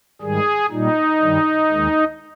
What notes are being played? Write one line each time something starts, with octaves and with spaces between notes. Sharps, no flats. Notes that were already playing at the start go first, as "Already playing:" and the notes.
G#2 D#3 G3 G#4
A#2 G3 D#4
G2 D#3 G3
D#2 D#3 G#3